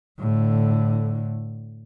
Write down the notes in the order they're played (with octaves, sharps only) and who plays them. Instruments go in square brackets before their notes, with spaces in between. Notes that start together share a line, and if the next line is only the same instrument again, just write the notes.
[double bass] A2 D3